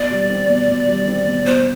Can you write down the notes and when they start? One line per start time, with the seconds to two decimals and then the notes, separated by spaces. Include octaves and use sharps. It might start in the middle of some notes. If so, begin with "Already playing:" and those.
Already playing: B2 D5
0.11 G3
0.30 C4
0.49 B2
0.69 B2
0.88 G3
1.08 C4
1.26 B2
1.45 B2 C5